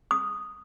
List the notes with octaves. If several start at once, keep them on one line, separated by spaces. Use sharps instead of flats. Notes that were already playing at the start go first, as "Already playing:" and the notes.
D#6